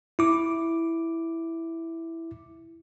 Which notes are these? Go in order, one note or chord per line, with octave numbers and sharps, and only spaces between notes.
E4 D6